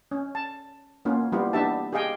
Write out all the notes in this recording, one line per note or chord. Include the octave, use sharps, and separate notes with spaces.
C#4
A5
A#3 B3 C#4 F4
G3 B3 E4 F4 G4
B3 D4 D#4 G4 E5 A5
G4 G#4 D#5 F5 G5 G#5